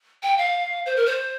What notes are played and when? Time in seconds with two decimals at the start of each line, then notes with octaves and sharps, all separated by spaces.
0.23 G5
0.38 F5
0.86 C5
0.96 A#4
1.06 C5